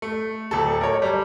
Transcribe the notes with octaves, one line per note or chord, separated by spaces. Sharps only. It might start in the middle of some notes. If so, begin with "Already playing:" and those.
A3
D1 A4
A#4 C#5
G3 A#5